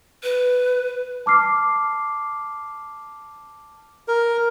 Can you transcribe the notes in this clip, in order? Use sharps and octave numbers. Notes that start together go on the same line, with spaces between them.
B4
A5 D6 F6 C7
A#4